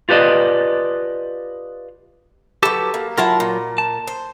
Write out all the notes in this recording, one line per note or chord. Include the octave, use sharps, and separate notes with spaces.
F4 G4 B4 D5 D#5
F#3 G4 A4 B4 A5
A#3
F#3 E4 F4 A#4 F#5 A5
A#2
A5
C5